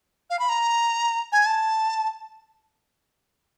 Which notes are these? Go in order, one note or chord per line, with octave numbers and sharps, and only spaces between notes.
F5
B5
A#5
G#5
A5